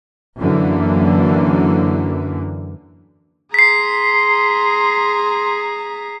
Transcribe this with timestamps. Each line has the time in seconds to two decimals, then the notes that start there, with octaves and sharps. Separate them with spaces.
0.39 F#2 D3 E3 A#3
3.54 G#4 A#5 C6 B6 C7